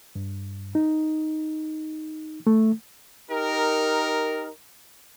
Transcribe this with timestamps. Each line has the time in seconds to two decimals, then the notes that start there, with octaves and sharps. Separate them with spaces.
0.16 G2
0.75 D#4
2.47 A3
3.31 D#4 G4 A#4